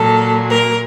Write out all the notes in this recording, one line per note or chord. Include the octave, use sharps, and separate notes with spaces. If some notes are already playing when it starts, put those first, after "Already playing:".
Already playing: A#2 F#3 A4
A#4